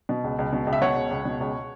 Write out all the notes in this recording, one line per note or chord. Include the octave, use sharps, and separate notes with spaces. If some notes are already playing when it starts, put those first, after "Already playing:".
B2
C#2
C#2
B2
C#2
E5
B2 C#5 F#5
C#2
C#2
B2
C#2